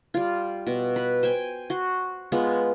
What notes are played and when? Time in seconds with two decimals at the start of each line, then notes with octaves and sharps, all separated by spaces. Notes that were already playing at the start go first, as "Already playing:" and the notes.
0.14 G3 F4
0.67 B2
0.96 B4
1.23 C5 G5 G#5
1.70 F#4 C6
2.32 G#3 B3 F4